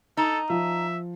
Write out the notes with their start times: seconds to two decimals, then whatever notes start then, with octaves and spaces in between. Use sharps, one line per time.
0.17 D#4 A4
0.50 F3 E5